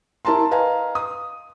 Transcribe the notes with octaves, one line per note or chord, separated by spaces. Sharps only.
E4 A#4 A5 A#5 C6
B4 D#5 F5 G#5 A#5
D#6